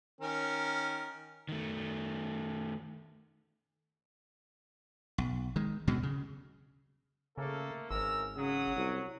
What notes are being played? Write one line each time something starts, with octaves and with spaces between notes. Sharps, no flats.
D#3 C#4 A#4
D#3 A3
B1
D#3 G#3
D2 B2 F#3 G#3
C#3
C#3 A3 A#3 A4
G#1 C#3 E3 A#4 E6
C#3 F#3 D#6
C2